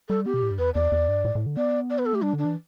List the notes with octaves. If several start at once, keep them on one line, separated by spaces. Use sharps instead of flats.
G3 A4
B3 G4
B2
A2
G2
E2 B4
E2 D5
E2
G2
A2
A2
D3
B3 D5
D5
B4
A4
A3 G4
G3 D4
D3
D4
E3